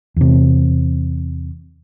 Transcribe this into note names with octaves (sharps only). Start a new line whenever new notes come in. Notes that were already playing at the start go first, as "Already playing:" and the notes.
E2 C3